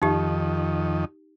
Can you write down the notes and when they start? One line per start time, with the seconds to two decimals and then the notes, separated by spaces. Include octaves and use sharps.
0.02 F2 D#3 D#4 G4